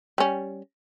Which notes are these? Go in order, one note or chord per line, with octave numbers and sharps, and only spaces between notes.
G3 C#4